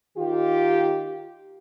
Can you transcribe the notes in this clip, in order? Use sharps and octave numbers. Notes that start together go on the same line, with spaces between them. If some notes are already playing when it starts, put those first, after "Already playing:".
D#3 F4 G4